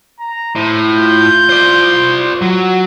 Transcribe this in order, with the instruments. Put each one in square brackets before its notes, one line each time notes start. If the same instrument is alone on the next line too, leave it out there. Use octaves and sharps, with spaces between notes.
[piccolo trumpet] A#5
[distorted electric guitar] A2 [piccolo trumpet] C5
[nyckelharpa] F4 [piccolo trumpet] G6
[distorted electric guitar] C5 D5
[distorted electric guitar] F#3 [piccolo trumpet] F#5